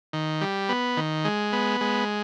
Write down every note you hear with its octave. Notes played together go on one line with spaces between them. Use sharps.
D#3
G3
B3
D#3
G#3
B3
G#3